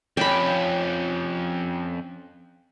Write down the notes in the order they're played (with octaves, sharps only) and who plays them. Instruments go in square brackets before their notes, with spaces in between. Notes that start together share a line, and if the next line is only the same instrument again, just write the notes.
[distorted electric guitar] F2 G4 [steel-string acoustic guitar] C#4 [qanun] G5 B5